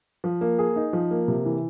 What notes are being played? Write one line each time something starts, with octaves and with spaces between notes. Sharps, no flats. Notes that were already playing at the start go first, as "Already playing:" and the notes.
F3
A#3
G#4
D#4
F3
A#3
C3
E3